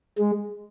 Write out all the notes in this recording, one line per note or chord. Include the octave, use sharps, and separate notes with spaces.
G#3